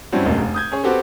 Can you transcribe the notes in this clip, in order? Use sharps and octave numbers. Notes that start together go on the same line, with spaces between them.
G2 G3 C4 C#4 E4 F#4
F1 A#1 F#2 B2 G#3 A#3
F1
D#6 G6 G#6
C#4 G#4 C#5
B3 C4 F#4 G4 A4 C5